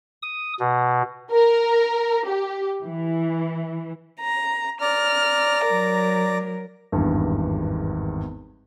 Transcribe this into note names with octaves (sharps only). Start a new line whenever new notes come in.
D#6
B2
A#4
G4
E3
A#5
D5 A#5 F6
F#3 A#4
G#1 E2 G2